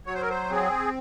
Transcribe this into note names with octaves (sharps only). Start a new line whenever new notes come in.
F#3 C#5
C5
A#4
C5
C4 G#4